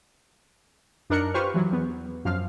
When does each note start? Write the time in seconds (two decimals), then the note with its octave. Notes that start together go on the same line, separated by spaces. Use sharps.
1.10 F#2 D4 D#4 A#4 F#6 C#7
1.34 F4 G4 B4 C5 C#6 F6
1.54 E3 F#3
1.72 E2 B3
2.25 F#2 F3 F5 F6